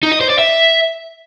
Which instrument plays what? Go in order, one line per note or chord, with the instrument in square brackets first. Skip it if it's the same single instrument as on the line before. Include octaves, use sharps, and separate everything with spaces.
[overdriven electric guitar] D#4
D#5
C5
D5
E5